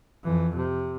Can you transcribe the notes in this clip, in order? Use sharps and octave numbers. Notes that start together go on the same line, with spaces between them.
F2 E3
C3